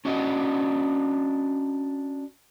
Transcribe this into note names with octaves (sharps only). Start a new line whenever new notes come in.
C#4 D4 F#4 D#5